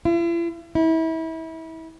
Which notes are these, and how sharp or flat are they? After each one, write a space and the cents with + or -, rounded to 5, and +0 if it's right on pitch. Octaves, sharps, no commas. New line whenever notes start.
E4 +45
E4 -30